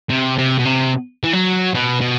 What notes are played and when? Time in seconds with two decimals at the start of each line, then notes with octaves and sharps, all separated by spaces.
0.10 C3
0.38 C3
0.59 B2
0.65 C3
1.24 E3
1.33 F#3
1.74 B2
2.01 B2